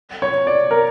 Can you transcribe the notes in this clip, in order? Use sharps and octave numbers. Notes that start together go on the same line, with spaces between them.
C#5
D5
A#4